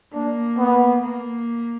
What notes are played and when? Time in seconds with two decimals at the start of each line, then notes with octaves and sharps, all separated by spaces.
0.14 A#3 D4
0.58 B3
1.03 A#3